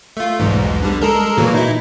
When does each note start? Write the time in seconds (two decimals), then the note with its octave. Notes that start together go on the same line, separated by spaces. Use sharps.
0.17 A3 F4
0.39 B1 E2 G#2
0.82 D3 G3
1.01 G#3 A4 A#4
1.38 A#2 E3 F#3
1.54 D#4 E4